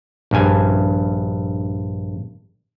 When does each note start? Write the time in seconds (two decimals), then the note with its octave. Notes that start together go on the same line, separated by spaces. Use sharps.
0.31 A#1 G2 G#5